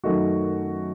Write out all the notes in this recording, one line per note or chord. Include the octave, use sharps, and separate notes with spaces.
F#2 D#3 A3 D#4 F#4